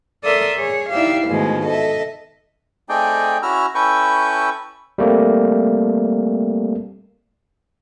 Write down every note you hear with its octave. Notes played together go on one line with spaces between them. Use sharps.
A4 A#4 D5 E5 C6 D#6
G#4 C#5
D#4 E4 G4 D5 E5 F5
G#2 B2 D#3 F3 G#3 A3
A4 D#5 E5
A3 C4 D#4 G#4 D5 G5
C#4 E4 F#4 A#5 E6 F6
C#4 E4 A4 B4 G5 C#6
G3 A3 A#3 C4